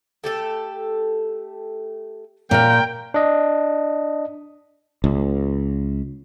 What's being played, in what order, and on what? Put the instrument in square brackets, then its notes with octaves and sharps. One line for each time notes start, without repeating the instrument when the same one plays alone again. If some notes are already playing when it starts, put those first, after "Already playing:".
[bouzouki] A3 G4 A4
[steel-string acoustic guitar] A#2 [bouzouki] C#4 F#4 F5 [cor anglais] A#4 [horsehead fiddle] G5
[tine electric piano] D4 D#5
[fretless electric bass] C#2